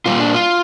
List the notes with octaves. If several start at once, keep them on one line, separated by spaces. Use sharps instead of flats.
A#2 G3 A#3 F4
D4
F4